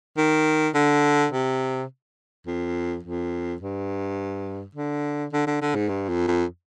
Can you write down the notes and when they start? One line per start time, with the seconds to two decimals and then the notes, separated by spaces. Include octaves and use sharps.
0.17 D#3
0.75 D3
1.32 C3
2.47 F2
3.03 F2
3.61 G2
4.75 D3
5.33 D3
5.47 D3
5.61 D3
5.75 G#2
5.89 G2
6.09 F2
6.28 F2